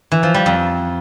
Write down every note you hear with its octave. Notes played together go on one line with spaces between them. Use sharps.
E3
F3
G3
F2